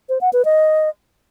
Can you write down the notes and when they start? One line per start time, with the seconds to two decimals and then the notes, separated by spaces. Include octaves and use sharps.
0.09 C5
0.21 F#5
0.33 B4
0.45 D#5